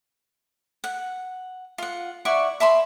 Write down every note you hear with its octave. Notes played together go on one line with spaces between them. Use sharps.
F#5
F4 F#5
E4 D5 F#5 C#6
E5 A5 B5 C6